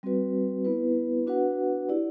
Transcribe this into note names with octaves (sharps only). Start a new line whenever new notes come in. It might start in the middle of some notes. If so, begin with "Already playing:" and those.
G3 C4 F#4 B4
B3 E4 B4
D4 F#4 B4 F#5
E4 G4 D5